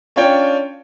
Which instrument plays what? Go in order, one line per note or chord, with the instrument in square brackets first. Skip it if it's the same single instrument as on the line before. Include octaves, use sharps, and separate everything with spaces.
[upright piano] C#4 D4 F4 C#5 G5